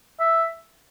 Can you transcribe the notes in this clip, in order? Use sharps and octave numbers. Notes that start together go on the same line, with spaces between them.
E5